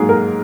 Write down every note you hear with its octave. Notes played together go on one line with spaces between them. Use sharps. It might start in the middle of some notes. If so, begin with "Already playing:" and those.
Already playing: G#2 F#3 A#3 G#4
A#4